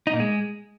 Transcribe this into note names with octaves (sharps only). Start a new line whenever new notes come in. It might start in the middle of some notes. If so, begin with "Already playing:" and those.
D#4
A#2
G#3